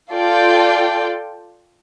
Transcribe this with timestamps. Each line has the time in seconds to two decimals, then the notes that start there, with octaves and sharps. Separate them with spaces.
0.12 F4 A4 D5 G5